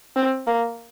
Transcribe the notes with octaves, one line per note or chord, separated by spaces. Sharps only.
C4
A#3